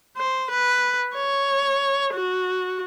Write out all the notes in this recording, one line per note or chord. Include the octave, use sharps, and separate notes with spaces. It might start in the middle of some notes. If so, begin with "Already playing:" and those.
C5
B4
C#5
F#4